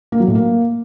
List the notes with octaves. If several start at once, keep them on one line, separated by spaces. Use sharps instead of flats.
A#3
F#3
A2
A#3